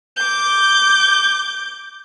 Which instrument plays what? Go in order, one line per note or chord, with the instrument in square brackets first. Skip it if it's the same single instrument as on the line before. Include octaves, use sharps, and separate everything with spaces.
[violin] D6 G6